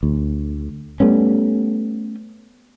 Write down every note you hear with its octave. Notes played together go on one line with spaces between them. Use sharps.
D2
G3 A3 B3 C#4